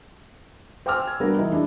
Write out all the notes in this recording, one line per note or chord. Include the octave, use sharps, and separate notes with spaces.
C5 G5 G#5 D6 E6 F6
G#6
G3 B3 D4 F#4 A#4
E3 D#4 G4
G#3 D4 E4